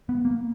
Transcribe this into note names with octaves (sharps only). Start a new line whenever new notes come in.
B3
A#3